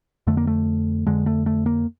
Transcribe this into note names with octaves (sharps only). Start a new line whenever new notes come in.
F2 D3 A3
A#3
A3
F2 D3 G#3
A3
A3
A#3